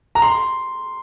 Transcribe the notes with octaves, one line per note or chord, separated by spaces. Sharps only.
A#5
C6